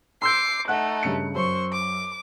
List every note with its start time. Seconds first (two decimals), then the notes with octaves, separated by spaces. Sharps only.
0.22 C6 D6 E6 G6 C7
0.68 A3 D#4 F#5 F#6
1.03 G2 C#3 C#7
1.35 F#2 C5 C#6
1.73 D6